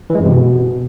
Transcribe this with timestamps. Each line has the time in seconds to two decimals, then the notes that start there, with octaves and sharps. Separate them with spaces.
0.10 E3
0.15 G#3
0.20 F#2
0.25 C3
0.30 B2